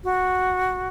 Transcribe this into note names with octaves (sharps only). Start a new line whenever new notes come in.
F#4